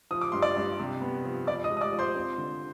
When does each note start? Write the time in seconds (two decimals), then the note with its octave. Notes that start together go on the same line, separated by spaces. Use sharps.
0.11 F3 D#6
0.21 D6
0.32 G2 C6
0.42 D5 D6
0.57 G2
0.80 C3
1.01 B3
1.24 F3
1.47 F3 D5 D6
1.64 D#5 D#6
1.70 G#3
1.77 D#6
1.81 D5 D6
1.93 F3
1.99 C5 C6
2.16 C4
2.38 D3